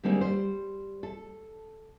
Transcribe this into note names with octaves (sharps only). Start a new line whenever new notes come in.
D3 G3 G#3 A#3 C4 D#4
G3 C5
A4